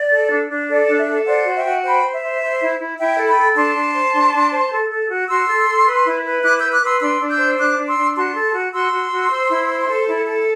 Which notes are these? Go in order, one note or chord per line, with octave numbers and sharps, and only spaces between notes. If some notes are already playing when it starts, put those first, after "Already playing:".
Already playing: D5
A4
D4
D4
A4 D5
D4
E5
A4
C5 D5 F#5
F#4
E5 G5
F#4
C5 G5 B5
C5
E5
C5
C5
E4
E4
E4 E5 G5
A4
G5 B5
A4
D4 A5 C6
D4
C5
D4
D4
C5
A4
A4
F#4
F#4 C6 E6
A4
A4
B4
E4
B4
E4 D6 F#6
B4 E6 G6
D6 F#6
B4
C6 E6
D4 C6 E6
D4
E6 G6
C5
D4 D6 F#6
D4
C6 E6
D4
F#4 A5 C6
A4
F#4
F#4 C6 E6
F#4
F#4
C5
E4
C5
A4
E4
A4